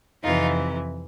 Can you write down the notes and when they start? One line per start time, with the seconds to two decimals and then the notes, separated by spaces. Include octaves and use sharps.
0.23 F2 C3 E3 D#4 F4